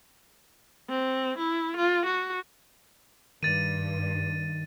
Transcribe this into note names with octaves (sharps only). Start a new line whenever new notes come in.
C4
E4
F4
F#4
G2 D#3 A6 D#7